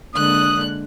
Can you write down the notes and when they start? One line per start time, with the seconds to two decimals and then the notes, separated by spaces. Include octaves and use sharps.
0.15 D3 G#3 A#3 D#6 F#6